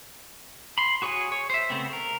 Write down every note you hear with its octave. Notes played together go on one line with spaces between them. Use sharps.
B5 C6
F#4 G#4 C#5 F#5 G#5
C#5
C5 E5
C#3 A3 B3 C4
A#4